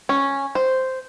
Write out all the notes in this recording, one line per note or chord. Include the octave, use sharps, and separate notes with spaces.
C#4
C5